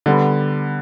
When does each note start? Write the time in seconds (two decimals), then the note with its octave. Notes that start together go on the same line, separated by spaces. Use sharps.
0.06 D3 G3 B3